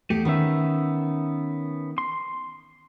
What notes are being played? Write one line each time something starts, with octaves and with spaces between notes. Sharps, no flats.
E2 A3 G4
D#3 B3 C#4 E5
C6